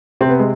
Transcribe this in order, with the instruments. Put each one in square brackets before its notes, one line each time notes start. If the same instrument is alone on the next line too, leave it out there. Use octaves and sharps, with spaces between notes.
[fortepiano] C3 [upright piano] C4
[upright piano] B3
G#3